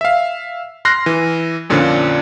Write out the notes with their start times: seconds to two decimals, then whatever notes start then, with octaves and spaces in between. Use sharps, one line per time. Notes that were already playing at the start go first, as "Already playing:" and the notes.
0.01 E5 F5
0.85 C6 F6 F#6 A#6 C7
1.06 E3
1.70 F2 A#2 D3 F3 C#4 D4